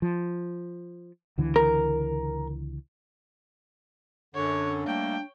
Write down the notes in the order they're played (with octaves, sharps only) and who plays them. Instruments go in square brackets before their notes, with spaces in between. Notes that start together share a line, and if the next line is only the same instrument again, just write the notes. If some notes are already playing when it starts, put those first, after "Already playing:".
[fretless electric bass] F3
C#2 D3 E3
[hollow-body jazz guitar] A#4
[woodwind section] F#2 D3 [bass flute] D4 [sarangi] C#5
[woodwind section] G3 A3 A#3 [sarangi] G5